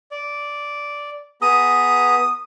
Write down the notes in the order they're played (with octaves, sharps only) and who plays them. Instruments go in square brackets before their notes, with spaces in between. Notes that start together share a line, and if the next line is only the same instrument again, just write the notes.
[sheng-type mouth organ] D5
[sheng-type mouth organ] B3 G#4 A#5 [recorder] D#6